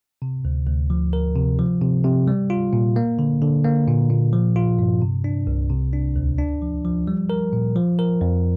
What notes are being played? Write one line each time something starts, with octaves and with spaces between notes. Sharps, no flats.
C3
D2
D2
F3
A#4
C3
F3
C3
C3
G3
F4
A#2
A#3
D3
D3
A#3
A#2
A#2
F3
F4
G2
C3
D4
C2
C3
D4
D2
D4
F3
F3
G3
A#4
A#2
F3
A#4
F2